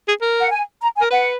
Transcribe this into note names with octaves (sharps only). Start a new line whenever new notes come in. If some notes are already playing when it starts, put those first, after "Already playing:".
G#4
A#4
F#5
G#5
A#5
G#5
A#4
B4 F#5